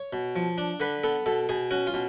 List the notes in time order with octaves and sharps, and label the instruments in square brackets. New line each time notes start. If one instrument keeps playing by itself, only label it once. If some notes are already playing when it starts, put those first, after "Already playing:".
Already playing: [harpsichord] C#5
B2
F3
D4
D3 B4
B3 A4
B2 A4
B2 G#4
C#4 F#4
F4
B2